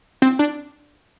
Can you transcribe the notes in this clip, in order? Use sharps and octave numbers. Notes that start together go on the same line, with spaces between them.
C4
D4